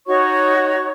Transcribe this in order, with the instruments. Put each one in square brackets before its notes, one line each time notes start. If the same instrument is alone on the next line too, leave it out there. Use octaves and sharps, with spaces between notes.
[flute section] D#4 F#4 C#5 C#6